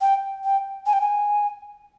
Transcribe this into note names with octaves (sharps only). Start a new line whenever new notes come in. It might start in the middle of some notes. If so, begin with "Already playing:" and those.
G5
G5
G#5
G5
G#5